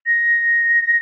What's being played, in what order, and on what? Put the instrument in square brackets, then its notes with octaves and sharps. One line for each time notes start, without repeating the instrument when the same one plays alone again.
[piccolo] A#6